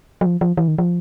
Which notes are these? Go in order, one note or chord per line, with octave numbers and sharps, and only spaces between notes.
F#3
F3
F3
E3
D#3
F3